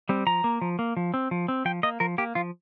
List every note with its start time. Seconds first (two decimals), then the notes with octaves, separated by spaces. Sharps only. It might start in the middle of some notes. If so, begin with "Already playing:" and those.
0.09 G3 C4
0.27 F3 A#5
0.44 A#3
0.62 F3
0.79 A#3
0.97 F3
1.14 C4
1.31 F3
1.48 C4
1.65 F3 G5
1.83 A#3 D#5
2.00 F3 A#4
2.18 A#3 G4
2.35 F3 F4